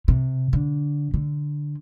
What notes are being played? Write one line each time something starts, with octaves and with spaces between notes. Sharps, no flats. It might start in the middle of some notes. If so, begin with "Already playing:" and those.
C3
D3
D3